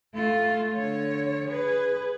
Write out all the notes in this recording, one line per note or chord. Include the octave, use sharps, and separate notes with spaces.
A3 F4
D3 C#5
G#4 B4